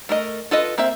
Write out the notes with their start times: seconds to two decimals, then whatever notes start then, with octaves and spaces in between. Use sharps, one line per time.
0.09 A3 A#4 D#5
0.51 F4 A4 B4 D#5
0.78 A#3 C4 E5